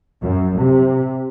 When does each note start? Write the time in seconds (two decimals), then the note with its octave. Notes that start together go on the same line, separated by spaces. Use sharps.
0.23 F#2
0.58 C3